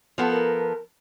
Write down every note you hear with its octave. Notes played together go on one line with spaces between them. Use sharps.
F3 B3 A4
A#4